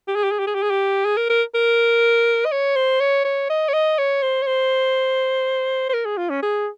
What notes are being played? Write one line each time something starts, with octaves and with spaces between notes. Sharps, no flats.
G4
G#4
G4
G#4
G4
G#4
G4
G#4
G4
G#4
A#4
A#4
A#4
D#5
C#5
C5
C#5
C#5
D#5
C#5
D#5
C#5
C5
C#5
C5
C5
A#4
G#4
F4
C#4
G#4